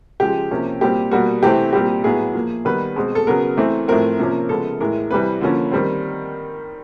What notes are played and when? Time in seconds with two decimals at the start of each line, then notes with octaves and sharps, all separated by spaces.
0.20 C#3 F3 G#3 G4
0.51 C3 F3 A#3 C#4
0.81 A#2 G3 C4 G4
1.11 B2 G3 A#3 F#4
1.42 C3 E3 A3 C4 G4
1.73 A#2 G3 C4 G4
2.04 A2 F#3 B3 G#4
2.34 A#2 F3 A#3
2.65 D#3 G3 B3 B4
2.96 B2 G#3 C4
3.15 A4
3.27 C#3 F#3 B3 A#4
3.57 E3 A3 C4
3.88 A2 F3 A3 C4 A#4
4.19 C3 F3 A#3 C#4
4.49 C#3 F3 G#3 B3 A4
4.80 A2 E3 G#3 A#4
5.11 C3 E3 G3 B4
5.41 D3 F3 A#3 C#4
5.72 D#3 G3 C4